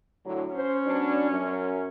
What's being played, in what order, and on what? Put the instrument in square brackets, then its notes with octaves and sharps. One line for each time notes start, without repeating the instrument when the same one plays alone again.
[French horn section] A2 D3 F#3
[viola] C#4 [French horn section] C5
[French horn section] F#3 B3 D4
F#2